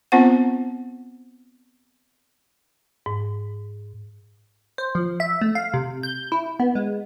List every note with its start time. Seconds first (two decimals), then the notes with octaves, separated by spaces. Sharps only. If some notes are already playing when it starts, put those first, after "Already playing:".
0.12 B3 C4 F4 C5 F#5
3.06 G#2
4.78 C5
4.95 F3
5.20 E5
5.41 A3
5.55 F5
5.74 C3
6.03 G6
6.32 E4
6.60 B3
6.75 G#3